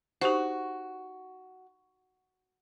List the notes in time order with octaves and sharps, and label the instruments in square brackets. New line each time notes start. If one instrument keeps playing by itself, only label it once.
[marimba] D#4 G4 C5 [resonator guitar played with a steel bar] F#4